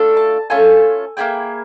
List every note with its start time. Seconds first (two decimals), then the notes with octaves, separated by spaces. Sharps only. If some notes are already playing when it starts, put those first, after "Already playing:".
Already playing: A3 D4 F4 A4
0.17 A5
0.50 A3 C#4 F4 A4 G#5
1.17 A#3 C#4 E4 G#4 G5